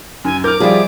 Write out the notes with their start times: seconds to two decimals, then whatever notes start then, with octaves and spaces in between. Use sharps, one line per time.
0.25 F#2 G#5
0.44 A#4 D6 F6 G6
0.60 F3 G3 F4 G#4 E5